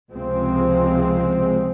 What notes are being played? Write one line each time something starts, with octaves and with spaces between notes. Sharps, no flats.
C#2 C3 F3 G#3 C4